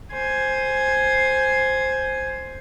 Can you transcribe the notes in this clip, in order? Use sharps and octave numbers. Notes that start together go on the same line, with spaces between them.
C5 G#5